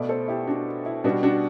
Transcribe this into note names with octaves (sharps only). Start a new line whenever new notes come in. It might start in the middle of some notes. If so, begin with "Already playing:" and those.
Already playing: B2 A3 B4 D5
A4 C5
E4 G4
D4 F#4
E4
B2 G3 B3 D4 F#4
D4 F#4